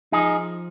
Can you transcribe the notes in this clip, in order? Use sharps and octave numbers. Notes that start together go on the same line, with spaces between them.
F3 D#4 G#4